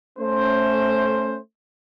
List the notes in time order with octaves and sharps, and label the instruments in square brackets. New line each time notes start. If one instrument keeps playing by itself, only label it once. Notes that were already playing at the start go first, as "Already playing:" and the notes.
[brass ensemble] A3 C#4 C5